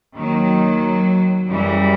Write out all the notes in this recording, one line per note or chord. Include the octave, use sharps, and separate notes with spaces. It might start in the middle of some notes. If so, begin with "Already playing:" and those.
D#2 D#3 F#3
F#2 C#3 E3 G3